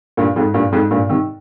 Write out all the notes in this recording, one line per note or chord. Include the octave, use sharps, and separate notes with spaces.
G2 A#2
F2 G#2
G2 A#2
F2 G#2
G2 A#2
C3 D#3